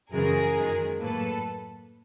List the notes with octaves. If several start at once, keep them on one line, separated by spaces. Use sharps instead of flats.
F#2 C#3 E3 G#3 G#4 A#4
F#2 D#3 G#3
A2 F#3 A#3 A4 B4